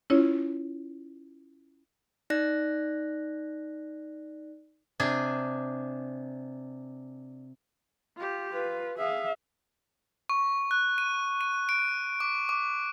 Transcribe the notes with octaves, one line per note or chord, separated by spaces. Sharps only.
C#4 E4 F4 C#5
D#4 D5 F#6 A#6
C3 D4 G#4
F4 G4
F4 B4
G#4 E5 F5
C#6
F#6
D#7
D#7
D7
D6
D6